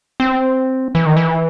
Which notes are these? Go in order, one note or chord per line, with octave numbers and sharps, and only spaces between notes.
C4
E3
D#3
E3